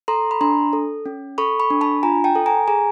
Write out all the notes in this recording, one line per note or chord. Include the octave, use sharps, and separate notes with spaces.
A4 A#5 C6
B5
D4 A#5 C6
A4
C#4
A4 B5 C#6
B5 C#6
D4
A5 B5
F4 G#5 A#5
G5 A5
A4
G#5 A#5
G#4 G#5 A#5